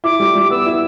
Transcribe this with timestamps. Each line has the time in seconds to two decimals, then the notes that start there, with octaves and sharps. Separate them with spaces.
0.04 E4 D6
0.20 G3
0.35 G3
0.50 B3 E6
0.66 E4